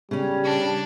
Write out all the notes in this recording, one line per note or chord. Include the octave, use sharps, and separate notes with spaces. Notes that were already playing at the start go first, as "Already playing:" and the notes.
C#3 G3 C#4
D4